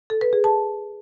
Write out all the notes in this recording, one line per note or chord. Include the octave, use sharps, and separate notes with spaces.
A4
B4
G#4
A5